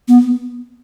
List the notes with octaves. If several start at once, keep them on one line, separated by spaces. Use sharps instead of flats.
B3